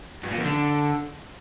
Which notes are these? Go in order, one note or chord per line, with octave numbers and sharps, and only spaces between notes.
G2
A#2
E2
D3